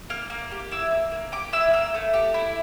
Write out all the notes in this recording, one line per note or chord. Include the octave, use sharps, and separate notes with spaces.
A#3 F6
A#3
G4
E4 E6
A#3
A#3
G4 D6
E4 E6
A#3 E6
A3
G4
E4